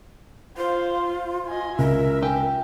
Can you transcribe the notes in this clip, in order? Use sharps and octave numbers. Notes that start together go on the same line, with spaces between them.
F4 C5 F5
D#5 G#5
C#2 A#4 E5
G4 G5 G#5